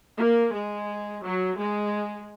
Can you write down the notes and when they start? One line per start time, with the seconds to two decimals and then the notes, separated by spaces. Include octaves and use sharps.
0.18 A#3
0.53 G#3
1.23 F#3
1.57 G#3